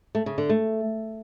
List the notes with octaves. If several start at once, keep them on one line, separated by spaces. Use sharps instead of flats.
A3
C#3
D3
A3